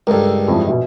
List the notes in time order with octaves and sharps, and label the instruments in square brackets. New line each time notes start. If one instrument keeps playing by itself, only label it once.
[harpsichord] C#2 G2 [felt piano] A4 A#4
[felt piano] F2 E3 F3
A#1 B2